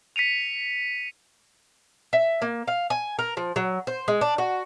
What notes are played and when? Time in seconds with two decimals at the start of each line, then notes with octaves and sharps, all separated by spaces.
0.16 B6 C#7 D#7 F7
2.13 E5
2.42 A#3
2.67 F5
2.90 G#5
3.19 A#4
3.37 F3
3.56 F#3
3.87 C5
4.08 G#3
4.21 D4
4.38 F#4